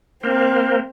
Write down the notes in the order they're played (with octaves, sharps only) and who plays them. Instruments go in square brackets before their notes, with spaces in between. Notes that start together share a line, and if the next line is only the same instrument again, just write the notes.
[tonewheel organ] A#3 A#4 C5 [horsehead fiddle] C4